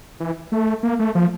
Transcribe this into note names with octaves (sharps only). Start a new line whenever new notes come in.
E3
A3
A#3
A3
F3